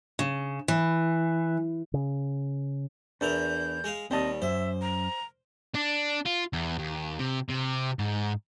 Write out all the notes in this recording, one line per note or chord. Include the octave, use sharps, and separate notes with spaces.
C#3
E3
C#3
E2 D4 E4 A#4 G6
G#3 G#4 F5
D#2 G3 C4 D#5 A5
F#2 C5 E5
A#5
D4
F4
E2
D#2
C3
C3
G#2